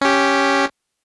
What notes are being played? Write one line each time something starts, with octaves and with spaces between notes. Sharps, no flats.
C#4 G4